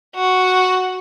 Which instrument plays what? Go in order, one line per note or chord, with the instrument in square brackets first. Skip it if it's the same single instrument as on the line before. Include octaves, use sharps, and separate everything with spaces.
[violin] F#4